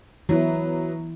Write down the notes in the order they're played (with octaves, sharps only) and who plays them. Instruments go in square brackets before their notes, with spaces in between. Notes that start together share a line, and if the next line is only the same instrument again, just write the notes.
[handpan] E3 E4 [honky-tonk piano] F#3 B3